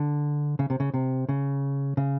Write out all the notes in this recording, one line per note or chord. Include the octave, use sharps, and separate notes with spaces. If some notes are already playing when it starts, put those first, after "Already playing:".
Already playing: D3
C#3
C3
C#3
C3
C#3
C#3